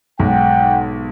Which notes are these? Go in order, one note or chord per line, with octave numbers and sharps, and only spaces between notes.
B1 G#2 F#5 G5